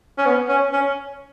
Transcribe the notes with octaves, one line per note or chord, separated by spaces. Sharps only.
C#4
B3
C#4
C#4